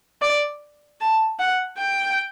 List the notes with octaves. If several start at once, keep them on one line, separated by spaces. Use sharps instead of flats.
D5
A5
F#5
G5